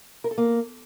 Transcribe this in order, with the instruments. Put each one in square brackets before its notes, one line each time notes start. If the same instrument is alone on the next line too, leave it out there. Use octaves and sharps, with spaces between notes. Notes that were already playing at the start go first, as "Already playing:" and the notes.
[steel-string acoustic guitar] A#4
A4
A#3